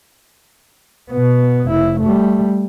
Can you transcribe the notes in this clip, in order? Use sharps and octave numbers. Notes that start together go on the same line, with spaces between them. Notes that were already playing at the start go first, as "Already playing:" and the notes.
B2 B3
F1 E4
G3 A3